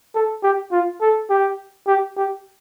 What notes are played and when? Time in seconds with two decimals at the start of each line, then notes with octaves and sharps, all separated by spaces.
0.15 A4
0.43 G4
0.72 F4
1.01 A4
1.30 G4
1.87 G4
2.17 G4